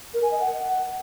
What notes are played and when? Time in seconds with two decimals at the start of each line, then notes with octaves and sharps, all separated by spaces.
0.14 A#4
0.22 G#5
0.31 D#5
0.40 F#5